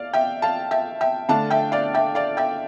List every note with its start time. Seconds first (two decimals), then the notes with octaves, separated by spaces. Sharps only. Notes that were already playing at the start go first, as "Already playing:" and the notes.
Already playing: D5 F5
0.13 E5 G5
0.42 F5 A5
0.71 E5 G5
1.01 E5 G5
1.29 D3 A3 D4 F5 A5
1.50 E5 G5
1.72 D5 F5
1.94 E5 G5
2.15 D5 F5
2.37 E5 G5